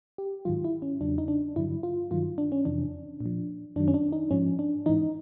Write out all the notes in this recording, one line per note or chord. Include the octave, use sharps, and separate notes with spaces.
G4
G#2 D#3 F#3 F4
E4
C#4
E2 C#3 F#3 D4
D#4
D4
G2 D3 F#3 E4
F4
G2 D#3 F#3 F4
D4
C#4
F2 C3 E3 D4
A#2
F3
F#2 D#3 F#3 D4
C#4
D4
D#4
G#2 F3 C#4
D4
G#2 E3 D#4